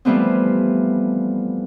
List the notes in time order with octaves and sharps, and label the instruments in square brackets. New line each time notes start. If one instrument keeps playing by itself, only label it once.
[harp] E3 F3 G3 A3 B3 C4